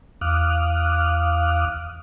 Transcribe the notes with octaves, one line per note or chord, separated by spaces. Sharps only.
E2 F5 D6 D#6 F6 F#6